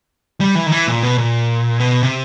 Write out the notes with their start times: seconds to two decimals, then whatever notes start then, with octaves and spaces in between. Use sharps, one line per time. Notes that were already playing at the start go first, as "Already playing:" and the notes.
0.41 G3
0.55 E3
0.66 D#3
0.72 E3
0.87 A#2
1.03 B2
1.18 A#2
1.80 B2
2.03 C3